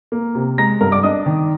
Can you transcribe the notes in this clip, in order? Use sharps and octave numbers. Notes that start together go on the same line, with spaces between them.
A#3
C3
G#3 A#5 A#6
G2 A#4 A#5
D5 D6
D4 D#5 D#6
D#3